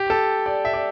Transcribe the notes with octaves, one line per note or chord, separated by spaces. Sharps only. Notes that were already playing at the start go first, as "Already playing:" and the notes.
Already playing: G4
A4
D5
E5
D5